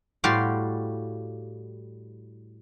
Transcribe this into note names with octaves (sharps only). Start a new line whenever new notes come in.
A2 G3 F#4 G4 F5 C6